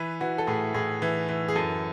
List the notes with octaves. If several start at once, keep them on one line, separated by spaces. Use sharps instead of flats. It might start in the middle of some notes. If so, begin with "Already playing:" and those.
Already playing: E3 B4
E3 F#4
A4
A2 G#4
A2 G#4
E3
E3
G#4
F#2 A4